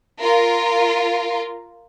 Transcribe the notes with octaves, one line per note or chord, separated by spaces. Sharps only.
F4 A#4